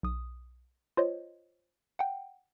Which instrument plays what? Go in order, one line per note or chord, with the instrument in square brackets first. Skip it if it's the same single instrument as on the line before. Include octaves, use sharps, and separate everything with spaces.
[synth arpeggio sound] B1 D#6
F4 C5 C#5 D#5
F#5 G5